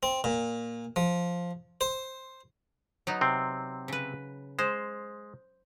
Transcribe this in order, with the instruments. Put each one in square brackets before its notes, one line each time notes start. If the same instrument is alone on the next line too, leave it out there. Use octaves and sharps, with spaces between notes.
[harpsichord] C4
A#2
F3
C5
[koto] F#3 B3 D#4
[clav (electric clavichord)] C3 C4
[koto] C#3 B4
[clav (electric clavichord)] G#3 [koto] C5